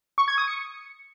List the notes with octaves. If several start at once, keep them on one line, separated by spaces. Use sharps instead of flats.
C#6
G#6
D#6
C#7